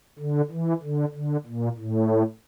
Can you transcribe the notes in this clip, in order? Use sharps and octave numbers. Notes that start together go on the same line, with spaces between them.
D3
E3
D3
D3
A#2
A2